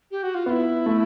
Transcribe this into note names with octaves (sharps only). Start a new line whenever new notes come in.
G4
F#4
F4
B3 E4 F4
A3